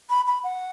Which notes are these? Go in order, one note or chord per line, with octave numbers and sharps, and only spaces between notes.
B5
B5
F#5